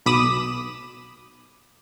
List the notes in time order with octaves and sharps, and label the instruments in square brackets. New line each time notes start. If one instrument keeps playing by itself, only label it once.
[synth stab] B1 B2 B5 D6 D#6 E7